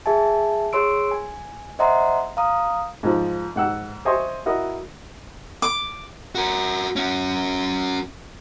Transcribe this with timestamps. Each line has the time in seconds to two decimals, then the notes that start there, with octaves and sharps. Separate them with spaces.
0.06 G#4 E5 G#5 A5
0.73 G#4 C#5 C6 E6 D7
1.11 G#5
1.79 C5 D#5 E5 F#5 A#5 C6
2.37 F5 A#5 D#6
3.03 G#2 F3
3.56 G#2 F#5 E6
4.05 C5 D#5 E5 G#5 C6 C#6
4.46 E4 F#4 A#4 D#5
5.62 D6
6.35 F#4 A#4
6.96 C#4 F#4